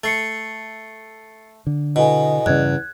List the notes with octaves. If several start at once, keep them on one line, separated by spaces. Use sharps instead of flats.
A3 A6 C7 C#7
D3
B2 E4 A4 D#5 G#5
E2 G2 C#3 F#6 G#6